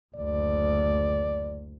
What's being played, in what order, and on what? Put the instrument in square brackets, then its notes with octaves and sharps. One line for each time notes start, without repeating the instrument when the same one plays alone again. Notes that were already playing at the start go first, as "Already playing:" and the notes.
[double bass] F#1 D2 [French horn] D5